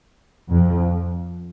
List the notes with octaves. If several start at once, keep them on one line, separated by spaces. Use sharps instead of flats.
F2